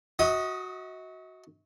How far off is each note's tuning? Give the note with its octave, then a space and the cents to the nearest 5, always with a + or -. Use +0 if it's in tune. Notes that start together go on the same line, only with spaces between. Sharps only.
F#4 +0 D#5 +45 D#6 +0